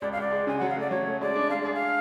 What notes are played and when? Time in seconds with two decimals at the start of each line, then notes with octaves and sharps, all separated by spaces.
0.02 C#2 D5
0.12 F5
0.17 C#2 D5
0.31 G#3
0.47 C#3 G#5
0.58 F#3 F#5
0.70 F5
0.76 A3 D5
0.91 F#3 C#5
1.06 A3
1.21 G#3 D5
1.35 D4
1.50 G#3 F5
1.62 G#4 D5
1.74 F5